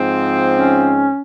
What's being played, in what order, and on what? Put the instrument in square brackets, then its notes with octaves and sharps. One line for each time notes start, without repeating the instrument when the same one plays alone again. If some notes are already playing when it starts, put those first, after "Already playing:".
Already playing: [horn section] G#2 F3 C4
[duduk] C#4